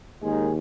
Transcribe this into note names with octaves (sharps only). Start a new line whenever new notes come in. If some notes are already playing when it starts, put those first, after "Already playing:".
D#2 D#3 G#3 G#4